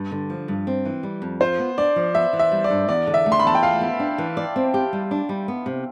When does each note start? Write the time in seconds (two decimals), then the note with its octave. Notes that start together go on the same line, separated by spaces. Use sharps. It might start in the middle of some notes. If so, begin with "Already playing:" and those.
Already playing: G2
0.12 D3
0.30 F3
0.48 G2
0.67 C4
0.85 E3
1.03 G3
1.22 F2
1.41 F4 C5
1.59 B3
1.78 D4 D5
1.96 F3
2.15 B3 E5
2.33 E3
2.39 E5
2.52 G3
2.64 D5
2.70 G2
2.89 E2 D5
3.07 D3
3.14 E5
3.26 A3
3.32 C6
3.39 B5
3.45 E2 A5
3.55 G5
3.63 F4 F5
3.81 B3
4.00 D4
4.18 E3
4.37 D5
4.56 C4
4.74 G4
4.93 G3
5.11 D4
5.29 G3
5.48 B3
5.66 C3